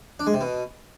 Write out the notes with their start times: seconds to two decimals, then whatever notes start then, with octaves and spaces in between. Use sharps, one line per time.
0.20 D4
0.27 G#3
0.34 C3
0.41 B2